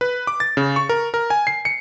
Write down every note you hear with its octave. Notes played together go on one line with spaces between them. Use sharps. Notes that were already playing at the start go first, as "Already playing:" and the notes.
B4
D6
A6
C#3
C#6
A#4
A#4
G#5
C7
C#7